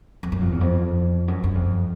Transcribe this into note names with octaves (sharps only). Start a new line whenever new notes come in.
F2
F#2
F2
E2
F2
F#2
F#2
F2